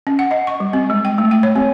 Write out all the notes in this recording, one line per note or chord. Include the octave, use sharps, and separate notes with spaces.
C#4
F#5
D#5
C#6
G3
C4
G#3
G5
A3
G5
C#5
C4